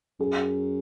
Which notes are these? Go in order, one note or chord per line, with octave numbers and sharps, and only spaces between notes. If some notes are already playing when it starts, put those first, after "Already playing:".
F#2 G#4